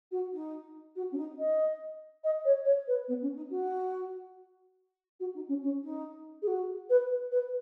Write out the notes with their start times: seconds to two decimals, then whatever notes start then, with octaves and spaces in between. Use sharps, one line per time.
0.11 F#4
0.33 D#4
0.96 F#4
1.12 C#4
1.17 D#4
1.39 D#5
2.24 D#5
2.45 C#5
2.65 C#5
2.88 B4
3.08 B3
3.22 C#4
3.36 D#4
3.50 F#4
5.20 F#4
5.35 D#4
5.48 C#4
5.62 C#4
5.83 D#4
6.42 G#4
6.47 F#4
6.90 B4
7.32 B4